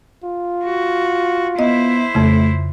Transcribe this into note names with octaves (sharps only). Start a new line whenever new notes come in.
F4
F#4
B3 E4 C5 D#5
F2 C#3 A3